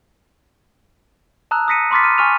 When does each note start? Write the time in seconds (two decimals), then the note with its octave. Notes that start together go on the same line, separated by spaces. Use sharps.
1.51 A5 A#5 D#6 E6 F#6
1.68 D#6 F#6 A#6 B6 C#7 D#7
1.91 B5 C6 D6 F6 A6 B6
2.03 F6 D#7
2.18 G#5 C#6 F6 D#7 F7